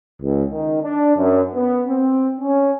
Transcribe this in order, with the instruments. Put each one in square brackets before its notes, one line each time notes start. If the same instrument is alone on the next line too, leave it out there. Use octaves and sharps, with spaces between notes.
[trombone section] C#2
D#3
D4
F#2
B3
C4
C#4